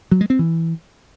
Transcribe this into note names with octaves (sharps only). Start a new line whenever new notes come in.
F#3
G#3
C4
E3